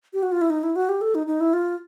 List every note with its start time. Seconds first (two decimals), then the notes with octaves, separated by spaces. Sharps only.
0.13 G4
0.23 F#4
0.32 F4
0.41 E4
0.50 D#4
0.63 E4
0.76 F#4
0.89 G4
1.01 A4
1.15 D#4
1.27 D#4
1.40 E4
1.53 F4